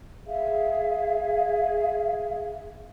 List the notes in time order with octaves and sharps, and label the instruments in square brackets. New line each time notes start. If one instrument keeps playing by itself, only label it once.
[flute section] G#4 E5 F5